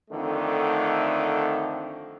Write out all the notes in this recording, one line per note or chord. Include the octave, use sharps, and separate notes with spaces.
F2 D3 D#3 A3